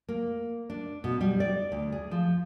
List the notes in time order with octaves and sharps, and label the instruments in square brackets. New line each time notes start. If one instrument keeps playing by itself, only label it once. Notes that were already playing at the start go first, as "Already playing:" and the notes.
[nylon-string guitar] A#3
D4
B2
G3
D5
D2
G#4
F3